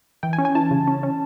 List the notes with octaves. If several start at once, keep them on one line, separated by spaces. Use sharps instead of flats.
E3 G5
G#5
C#4
G#5
E3 A5
C#3
C#4
C#4